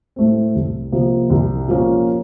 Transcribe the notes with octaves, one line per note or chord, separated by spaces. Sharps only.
A2 A3 C4
C2
C3 F3 A#3
C2
A#2 F3 A#3 C#4